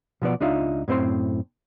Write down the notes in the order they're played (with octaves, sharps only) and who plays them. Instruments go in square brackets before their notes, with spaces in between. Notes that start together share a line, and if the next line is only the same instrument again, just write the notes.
[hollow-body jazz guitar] B2 F3 B3 D5
C#2 D4 D#4 F4 E5
F#2 A2 C4 C5 C6